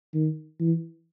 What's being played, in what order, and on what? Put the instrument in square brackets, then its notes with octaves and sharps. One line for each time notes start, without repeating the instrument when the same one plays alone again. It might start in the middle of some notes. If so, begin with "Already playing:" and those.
[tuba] D#3
E3